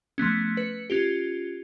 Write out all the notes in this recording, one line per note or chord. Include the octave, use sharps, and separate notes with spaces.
F3 A3 B3 C#4
B4 C#7
C#4 F4 G4